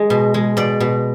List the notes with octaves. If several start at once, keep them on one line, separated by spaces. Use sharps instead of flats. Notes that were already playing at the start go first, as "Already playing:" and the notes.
Already playing: G#3
B2
G#3
B2 D5
B2